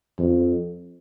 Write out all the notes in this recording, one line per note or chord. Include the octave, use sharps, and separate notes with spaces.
F2